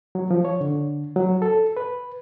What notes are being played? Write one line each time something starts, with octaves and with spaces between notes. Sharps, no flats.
F#3
F3
C#5
D3
F#3
A4
B4